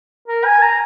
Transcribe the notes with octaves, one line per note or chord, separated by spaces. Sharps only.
A#4
G#5
A#5